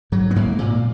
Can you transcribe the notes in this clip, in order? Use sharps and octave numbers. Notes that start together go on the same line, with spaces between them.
G#2 F#3
B3
G#2 A#3
A#2